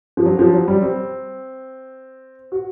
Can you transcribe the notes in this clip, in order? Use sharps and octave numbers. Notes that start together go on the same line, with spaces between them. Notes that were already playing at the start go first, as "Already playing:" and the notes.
F3
F#3
F3
F#3
G3
C4
F#4